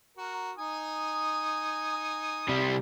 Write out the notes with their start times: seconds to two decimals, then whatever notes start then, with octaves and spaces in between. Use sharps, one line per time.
0.17 F#4 A#4
0.58 D#4 G#5 D#6
2.49 C3 G3